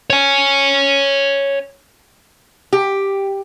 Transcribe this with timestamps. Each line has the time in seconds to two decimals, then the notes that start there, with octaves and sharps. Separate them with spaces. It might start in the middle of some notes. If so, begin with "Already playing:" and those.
0.10 C#5 G#5
2.73 G4